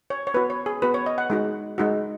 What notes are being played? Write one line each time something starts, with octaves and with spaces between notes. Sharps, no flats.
C#5
C#5
B3 F#4 B4
C#5
G#4
B3 F#4 B4
C#5
D#5
F#5
G#3 D#4 F#4
G#3 D#4 F#4